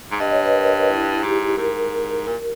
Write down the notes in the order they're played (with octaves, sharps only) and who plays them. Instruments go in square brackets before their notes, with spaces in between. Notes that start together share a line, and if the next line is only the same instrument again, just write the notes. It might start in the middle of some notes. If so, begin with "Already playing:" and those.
[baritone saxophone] G#2
[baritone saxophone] G2 [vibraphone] D#5
[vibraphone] C#5
B4
A#4
E4
[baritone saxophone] G#2 [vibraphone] G4
[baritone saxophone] G#2 [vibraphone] A#4
[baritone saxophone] A#2